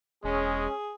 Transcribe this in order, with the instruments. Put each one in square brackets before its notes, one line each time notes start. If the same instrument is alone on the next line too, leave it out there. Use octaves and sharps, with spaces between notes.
[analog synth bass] E1 [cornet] G#3 [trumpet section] C#4 [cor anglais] G#4